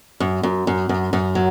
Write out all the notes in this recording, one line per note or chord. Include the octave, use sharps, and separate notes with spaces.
F#2
F#2
F#2
F#2
F#2
F#3